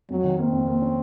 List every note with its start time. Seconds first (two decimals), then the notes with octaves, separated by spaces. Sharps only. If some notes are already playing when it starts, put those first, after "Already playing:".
0.10 F2 F#3
0.24 D#3
0.39 A#3 C4
0.53 F2
0.68 A#3
0.82 C#4